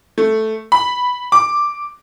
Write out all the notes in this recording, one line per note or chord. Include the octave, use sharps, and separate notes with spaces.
A3
B5
D6